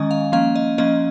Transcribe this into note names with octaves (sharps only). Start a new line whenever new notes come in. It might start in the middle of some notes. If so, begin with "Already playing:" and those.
Already playing: D#3 G#3 C#4 D#5
F5
F3 A#3 C#4 F5
D#5
F3 A#3 C#4 D#5